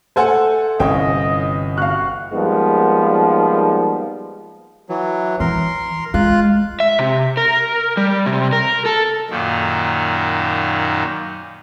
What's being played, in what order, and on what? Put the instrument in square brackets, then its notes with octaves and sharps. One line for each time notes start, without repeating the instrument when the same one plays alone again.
[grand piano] A3 A4 F#5 [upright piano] C5 G#5
[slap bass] G1 E3 [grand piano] C2 C#4 G5 [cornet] D#5
[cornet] F#4 [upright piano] F5 F#6
[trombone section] F3 G3 G#3 A#3 B3 D#4
[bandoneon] E3 F#3
[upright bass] E3 [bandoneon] A#4 C6
[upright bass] G#3 [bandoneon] F4 F5 F#6
[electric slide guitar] E5
C3
A#4
G3
C3
A#4
A4
[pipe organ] F#2 A#2 D#3